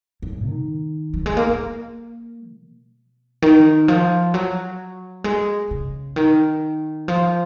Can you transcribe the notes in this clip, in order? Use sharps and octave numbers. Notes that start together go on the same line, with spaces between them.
F#2
D#3
F#3
G#3
A#3
A#3
B2
D#3
F3
F#3
G#3
C#3
D#3
F3